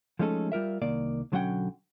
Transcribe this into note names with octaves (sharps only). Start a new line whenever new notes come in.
F3 G#3 A3 C#4 D#4 A4
G3 F4 A#4 E5
C2 D#3 A#3 D5
B1 D3 F#3 C#4 F#5 G5